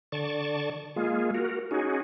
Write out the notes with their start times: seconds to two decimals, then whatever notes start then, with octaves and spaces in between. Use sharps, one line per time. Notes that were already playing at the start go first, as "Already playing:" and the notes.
0.12 D3 D5 A5 C#6
0.96 G#3 A#3 F4 G#4
1.34 F#4 A#4
1.71 C#4 D#4 F#4 G#4